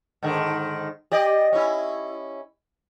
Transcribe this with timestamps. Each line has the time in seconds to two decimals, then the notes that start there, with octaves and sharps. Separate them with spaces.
0.23 G#2 D3 D#3
1.11 G4 D5 D#5
1.53 C#4 E4